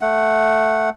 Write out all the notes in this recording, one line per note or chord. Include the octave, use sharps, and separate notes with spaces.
A3 F#5